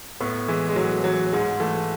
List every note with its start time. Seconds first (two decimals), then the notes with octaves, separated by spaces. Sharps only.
0.20 A2 B3
0.48 E3 G#3
0.69 G#3
0.76 A2 F#3
1.04 E3 F#3
1.32 G#2 G#3
1.60 E3 A3